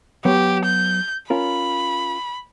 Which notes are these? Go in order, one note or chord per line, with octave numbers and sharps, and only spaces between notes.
F#3 B3 G4 C#5
G6
C#4 F4 A#4 B5